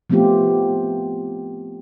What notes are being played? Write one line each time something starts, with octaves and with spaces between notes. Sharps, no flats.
F3 A3 B3 C4 F4 G4